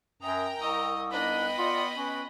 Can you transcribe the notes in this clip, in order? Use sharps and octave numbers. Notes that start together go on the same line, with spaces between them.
F#2 A#4 G5 A#5 D#6
C2 D#5 C#6 D#6 E6
B3 D4 D#4 D#5 G5 B5 F#6
F4 D5 F#5 D#6
C#4 B4